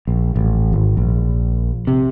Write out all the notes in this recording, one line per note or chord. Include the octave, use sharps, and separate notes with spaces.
A#1
A1
G#1
A#1
C3